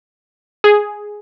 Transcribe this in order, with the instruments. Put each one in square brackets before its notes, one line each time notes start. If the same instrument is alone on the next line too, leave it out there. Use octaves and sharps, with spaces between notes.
[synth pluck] G#4